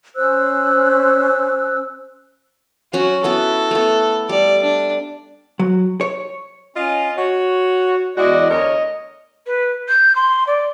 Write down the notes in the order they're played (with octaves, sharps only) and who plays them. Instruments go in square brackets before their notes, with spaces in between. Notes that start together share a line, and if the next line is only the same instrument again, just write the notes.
[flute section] C#4 C5 E6 F#6
[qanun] F#3 C#4 [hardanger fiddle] F#4
[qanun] B3 E4 F#4 [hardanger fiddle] A4
[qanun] A3 B3
[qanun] G3 [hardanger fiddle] D5
[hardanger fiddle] D4
[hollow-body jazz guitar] F#3
C#5
[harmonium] C#4 [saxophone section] F4 D#5
[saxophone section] F#4 [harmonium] C#5
[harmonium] E2 D5 D#5 [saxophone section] G#3 E4 F#4
[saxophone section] D2 A#4 C#5 [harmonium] D#5
[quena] B4
G6
C6
D5